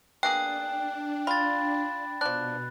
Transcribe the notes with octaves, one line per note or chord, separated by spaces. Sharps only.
B2 A#3 D4 G#4 G5 F#6
F4 B5 A6
B2 F3 D4 F#6